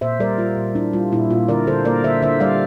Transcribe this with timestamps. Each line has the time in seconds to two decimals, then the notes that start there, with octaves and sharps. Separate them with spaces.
0.01 A#2 C5 E5
0.20 G3 A#4 D5
0.38 G3 F4
0.56 A#2
0.75 D4 E4
0.93 G3 F4
1.12 A#2 E4
1.30 A#2 F4
1.48 D3 A#4 D5
1.67 D3 A4 C5
1.85 A#3 A#4 D5
2.04 D3 C5 E5
2.22 D3 C5 E5
2.40 G3 D5 F5